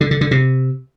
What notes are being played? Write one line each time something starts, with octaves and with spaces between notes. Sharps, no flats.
D3
D3
D3
C3